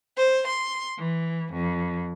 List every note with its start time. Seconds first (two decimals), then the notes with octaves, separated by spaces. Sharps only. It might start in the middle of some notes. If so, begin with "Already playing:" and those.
0.18 C5
0.48 C6
0.98 E3
1.52 F2